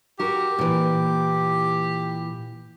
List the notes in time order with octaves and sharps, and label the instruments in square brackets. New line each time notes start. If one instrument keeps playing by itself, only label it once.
[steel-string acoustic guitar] F#4 A#4 [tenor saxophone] G4
[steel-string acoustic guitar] A#2 E3